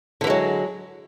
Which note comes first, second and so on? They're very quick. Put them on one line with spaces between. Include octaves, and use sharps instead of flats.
D3 E3 G#3 F#3